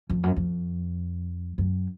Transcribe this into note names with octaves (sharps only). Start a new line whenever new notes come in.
F2
F#2
F2
F#2